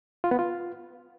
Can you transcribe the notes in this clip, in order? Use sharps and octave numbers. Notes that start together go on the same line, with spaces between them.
F4
B3
F4